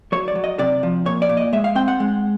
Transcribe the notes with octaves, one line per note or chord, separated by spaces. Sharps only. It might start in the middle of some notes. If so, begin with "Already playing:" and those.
F#3 C#5
D5
F#3
D#5
C3 D5
F3
A#2 C#5
D5
A#2
D#5
G#3 E5
F5
C4 G5
F#5
G#3